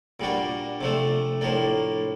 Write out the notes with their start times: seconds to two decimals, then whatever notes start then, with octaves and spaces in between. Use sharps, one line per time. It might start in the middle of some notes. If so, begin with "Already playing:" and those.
0.20 A#2 G3 A#3 D4 F#4
0.81 C3 F3 A3 D4
1.41 A2 F3 A#3 D4